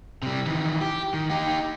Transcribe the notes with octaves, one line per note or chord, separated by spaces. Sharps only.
C3 G3
D#3 E3
G4
D#3
D#4 G4